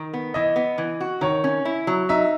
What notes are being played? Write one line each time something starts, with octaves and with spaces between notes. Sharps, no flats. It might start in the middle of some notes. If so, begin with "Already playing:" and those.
Already playing: D#3
B3
E3 D#5
B3
E3
F#4
D#3 C#5
C#4
E4
F#3
D#4 E5